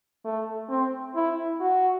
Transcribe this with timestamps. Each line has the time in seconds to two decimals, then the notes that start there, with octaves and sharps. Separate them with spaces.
0.25 A3
0.70 C4
1.15 E4
1.61 F#4